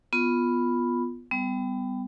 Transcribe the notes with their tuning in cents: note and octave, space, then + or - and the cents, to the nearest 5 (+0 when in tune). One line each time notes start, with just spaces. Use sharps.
B3 +0 F4 +0 B5 +0
G3 +0 B3 +30